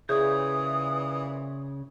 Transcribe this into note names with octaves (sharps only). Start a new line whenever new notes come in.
A#2 C#3 E3 G#4 C#5 D#6 G6